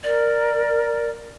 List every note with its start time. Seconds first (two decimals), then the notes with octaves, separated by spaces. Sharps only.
0.03 A#4 D5